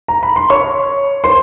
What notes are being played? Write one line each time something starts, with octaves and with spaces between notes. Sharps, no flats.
A#5
B5
C6
C#5 C#6
C5 C6